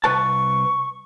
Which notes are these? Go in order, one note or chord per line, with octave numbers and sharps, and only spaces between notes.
C2 B4 A5 C#6